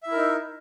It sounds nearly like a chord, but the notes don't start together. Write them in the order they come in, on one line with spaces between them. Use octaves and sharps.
E5 E4 A#4 D#4